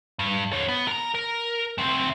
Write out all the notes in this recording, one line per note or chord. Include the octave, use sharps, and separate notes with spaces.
G2
D3 C#5
B3
A#4 A#5
A#4
D2 C4